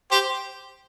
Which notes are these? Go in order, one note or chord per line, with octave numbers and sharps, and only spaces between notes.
G4 C5